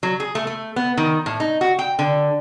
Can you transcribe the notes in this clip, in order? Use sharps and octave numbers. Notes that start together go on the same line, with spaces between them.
F#3
G#4
A3
A3
B3
D#3
A2
D#4
F#4
G5
D3